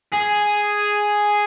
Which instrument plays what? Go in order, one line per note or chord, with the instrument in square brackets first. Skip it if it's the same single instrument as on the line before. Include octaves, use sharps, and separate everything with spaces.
[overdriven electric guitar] G#4